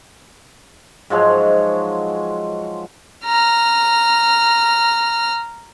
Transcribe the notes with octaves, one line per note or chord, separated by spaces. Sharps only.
G#2 F3 F#3 G#3
A#5 F6